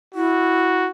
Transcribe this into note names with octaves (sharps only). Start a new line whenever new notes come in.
E4 F#4